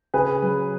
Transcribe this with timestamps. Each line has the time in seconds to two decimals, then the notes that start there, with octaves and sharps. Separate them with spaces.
0.14 C#3 G#4 B4
0.43 F#3